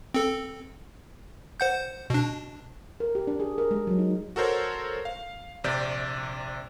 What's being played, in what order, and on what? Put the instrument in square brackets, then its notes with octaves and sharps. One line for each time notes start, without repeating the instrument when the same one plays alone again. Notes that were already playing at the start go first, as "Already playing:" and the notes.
[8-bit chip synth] C4 A4
C5 F#5 G6
B2 D4
[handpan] A#4
G4
D4
G#4
A#4
G#3
F#3
D#4
[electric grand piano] F#4 A4 A#4 C5 C#5
F5
A#1 C3 D5 G6